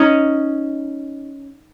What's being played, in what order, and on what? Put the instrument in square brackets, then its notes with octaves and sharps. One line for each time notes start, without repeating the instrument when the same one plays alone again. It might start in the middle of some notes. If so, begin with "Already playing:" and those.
Already playing: [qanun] C#4 D#4 C#5 D#5